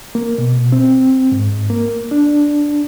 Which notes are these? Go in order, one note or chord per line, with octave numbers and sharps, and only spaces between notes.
A#3
B2
C4
G#2
A#3
D4